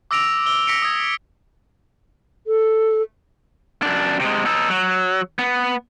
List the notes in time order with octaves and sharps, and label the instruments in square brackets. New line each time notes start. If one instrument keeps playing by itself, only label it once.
[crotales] D6 E6 A#6 D7 F7
E6 G7
D6 A#6 B6 C#7 D7
D#6 G#6
[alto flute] A4
[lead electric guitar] F#2 D4
C3 G#3
D#4 A4
F#3
B3